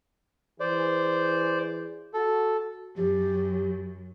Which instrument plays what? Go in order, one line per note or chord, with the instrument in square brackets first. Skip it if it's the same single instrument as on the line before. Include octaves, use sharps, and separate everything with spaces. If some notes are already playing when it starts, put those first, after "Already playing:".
[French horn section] E3 G#4 [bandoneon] C5 D5
[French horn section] F#4 [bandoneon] A4
[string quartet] F#2 [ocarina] G4